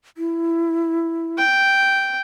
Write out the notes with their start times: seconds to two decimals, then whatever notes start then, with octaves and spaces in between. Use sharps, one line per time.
0.18 E4
1.38 G5